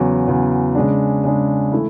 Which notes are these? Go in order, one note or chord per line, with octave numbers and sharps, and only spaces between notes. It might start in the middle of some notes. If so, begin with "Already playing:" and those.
Already playing: E2 C#3 F#3
E2 C#3 F#3
C#3 G#3 D4
C#3 G#3 D4
E3 A3 E4